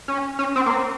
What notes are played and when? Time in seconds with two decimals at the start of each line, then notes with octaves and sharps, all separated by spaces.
0.08 C#4
0.39 C#4
0.56 C4
0.66 A#3
0.71 C4